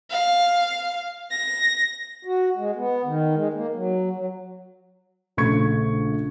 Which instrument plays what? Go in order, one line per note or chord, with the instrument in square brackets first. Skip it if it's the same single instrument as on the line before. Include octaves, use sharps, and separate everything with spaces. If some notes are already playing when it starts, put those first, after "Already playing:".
[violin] F5
A#6
[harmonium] F#4
G#3
B3
D#3
G#3
A#3
F#3
F#3
[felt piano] A#1 C#3 A3 C#6 G#6 C#7